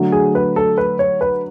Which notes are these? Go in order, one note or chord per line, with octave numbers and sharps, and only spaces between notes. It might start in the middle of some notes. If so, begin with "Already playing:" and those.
Already playing: D3 F#3 A3
G#4
B4
A4
B4
C#5
B4